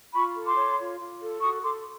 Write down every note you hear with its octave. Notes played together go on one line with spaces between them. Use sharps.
F4 B5 C#6
A4
C6 D6
C#5
F4
F4
A4
F#4 C#6 D#6
A4 C6 D6